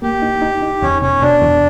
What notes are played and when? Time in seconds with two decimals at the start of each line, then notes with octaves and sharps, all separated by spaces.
0.02 A#3 G4
0.22 D#4
0.42 D#4
0.62 D#4
0.82 E2 C#4
1.02 B2 C#4
1.22 B2 D4
1.42 E2